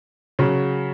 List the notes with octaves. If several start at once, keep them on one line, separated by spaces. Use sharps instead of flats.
C#3 F#3